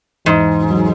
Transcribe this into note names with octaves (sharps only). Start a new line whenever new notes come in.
E2 G#2
F#3